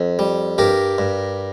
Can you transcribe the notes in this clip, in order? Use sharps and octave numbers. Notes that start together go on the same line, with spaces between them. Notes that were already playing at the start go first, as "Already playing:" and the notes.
Already playing: F2
G3
G2 G4 A#4
G2